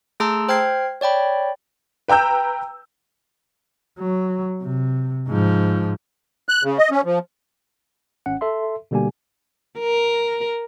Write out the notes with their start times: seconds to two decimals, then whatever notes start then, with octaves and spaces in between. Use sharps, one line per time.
0.20 A3 G#4 A5 A#5 C6 E6
0.49 C5 G5 F6 G#6 C7
1.01 C#5 D5 G5 B5
2.08 B4 G5 A#5 E6 G6
3.98 F#3
4.62 C3
5.28 G#2 F3
6.49 F#6
6.63 C#3
6.78 D#5
6.91 C#4
7.05 F3
8.26 G#1 C#4 F#5
8.41 A4 E5 C6
8.91 B2 D3 G3 A#3 G4 G#5
9.79 A#4